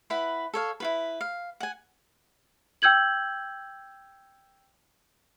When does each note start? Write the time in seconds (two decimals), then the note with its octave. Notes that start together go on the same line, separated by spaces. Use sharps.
0.10 E4 B4 F#5 B5
0.54 A4 C#5 F5
0.80 E4 F4 B4
1.21 F5
1.60 F#5 G#5
2.82 G5 E6 G6 G#6 F#7